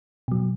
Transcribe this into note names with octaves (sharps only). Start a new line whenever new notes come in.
B2 F#3